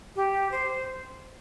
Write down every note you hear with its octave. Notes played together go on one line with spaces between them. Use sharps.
G4
C5